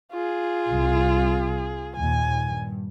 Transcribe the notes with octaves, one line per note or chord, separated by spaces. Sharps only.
F4 G#4
C2 C3
D#2 A#2 G#5
G2